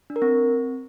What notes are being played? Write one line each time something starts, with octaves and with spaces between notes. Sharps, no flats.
D4
A#4
C4